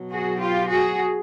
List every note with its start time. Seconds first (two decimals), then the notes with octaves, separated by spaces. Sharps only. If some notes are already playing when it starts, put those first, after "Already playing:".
Already playing: B2 F#3
0.11 F#4 G#4
0.40 F4 G4
0.68 F#4 G#4